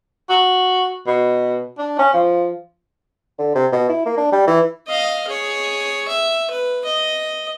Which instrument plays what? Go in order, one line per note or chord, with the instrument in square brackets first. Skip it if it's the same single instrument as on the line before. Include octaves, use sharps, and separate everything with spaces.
[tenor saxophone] F#4
B2
D4
C#4
F3
[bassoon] D3
C3
B2
E4
A#3
D4
G3
E3
[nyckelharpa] D#5 F5
G#4 C#5
E5
B4
D#5